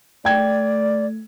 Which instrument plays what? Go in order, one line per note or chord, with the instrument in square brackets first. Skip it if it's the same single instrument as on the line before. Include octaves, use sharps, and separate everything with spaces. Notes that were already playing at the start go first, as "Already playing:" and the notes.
[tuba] A3 [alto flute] D5 [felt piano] G5 G#6